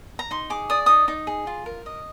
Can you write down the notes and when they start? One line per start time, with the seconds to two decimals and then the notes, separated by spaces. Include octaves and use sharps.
0.19 A#5
0.31 D#4 C6
0.50 G#4 D6
0.70 D5 D#6
0.86 D#4 D#6
1.08 D#4
1.27 G#4
1.47 F4
1.66 A#4
1.86 D#5